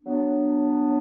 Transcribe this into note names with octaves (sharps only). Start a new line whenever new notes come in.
F#3 B3 D4